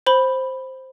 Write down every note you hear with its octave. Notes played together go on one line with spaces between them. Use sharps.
C5 B5 G7